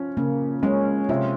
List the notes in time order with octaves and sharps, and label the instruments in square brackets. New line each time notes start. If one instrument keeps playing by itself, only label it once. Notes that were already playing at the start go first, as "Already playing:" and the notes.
Already playing: [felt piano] F3 C#4
[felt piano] C#3 [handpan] A#3
[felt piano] G#3 [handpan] C#4
[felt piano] C3 [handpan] F4